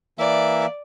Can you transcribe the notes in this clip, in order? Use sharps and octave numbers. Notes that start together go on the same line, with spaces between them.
E3 A#3 D5 E5